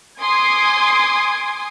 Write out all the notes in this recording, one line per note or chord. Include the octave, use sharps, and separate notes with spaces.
G#5 C6 D6 D#6 G#6 C7